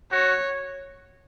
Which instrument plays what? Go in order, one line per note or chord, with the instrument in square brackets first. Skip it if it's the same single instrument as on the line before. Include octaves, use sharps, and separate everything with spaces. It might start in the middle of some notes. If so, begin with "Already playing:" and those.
[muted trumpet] F#4 [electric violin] C#5